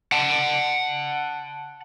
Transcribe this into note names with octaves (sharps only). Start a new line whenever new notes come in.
F#5 A5